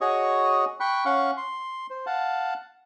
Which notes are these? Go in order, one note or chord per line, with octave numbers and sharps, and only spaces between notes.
F#4 G#4 C#5 D#5 C#6 D#6
G5 B5 C#6 F#6
C#4 F5 F#5 C#6
C6
C5
F5 F#5 A5